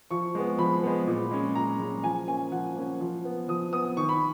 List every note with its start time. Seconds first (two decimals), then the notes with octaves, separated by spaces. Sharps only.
0.11 F3 C#6
0.35 G#3 B3
0.59 F3 B5
0.83 G#3 B3
1.07 A#2
1.31 G#3 C#4
1.55 A#2 A#5
1.80 G#3 C#4
2.03 F3 G#5
2.28 A#3 C#4 G#5
2.52 F3 F#5
2.76 A#3 C#4
3.01 F3
3.25 B3
3.48 F3 D#6
3.73 B3 D#6
3.97 D#3 C#6
4.09 B5